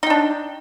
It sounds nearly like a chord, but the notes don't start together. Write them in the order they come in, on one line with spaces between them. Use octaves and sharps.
D#4 G5 D4